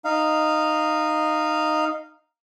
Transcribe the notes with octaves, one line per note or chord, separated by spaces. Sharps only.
D#4 F5